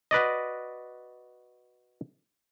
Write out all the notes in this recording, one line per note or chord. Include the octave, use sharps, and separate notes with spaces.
F#4 B4 D5 D#5